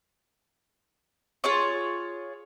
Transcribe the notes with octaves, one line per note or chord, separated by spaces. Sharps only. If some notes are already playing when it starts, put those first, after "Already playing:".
F4 G#4 C#5